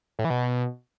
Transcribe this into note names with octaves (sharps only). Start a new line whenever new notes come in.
A2
E3
B2